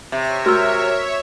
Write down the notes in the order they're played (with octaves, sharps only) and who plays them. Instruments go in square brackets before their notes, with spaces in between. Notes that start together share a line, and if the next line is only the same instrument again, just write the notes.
[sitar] C3 [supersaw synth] C#5 E5
[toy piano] F#4 E6 [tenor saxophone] A#4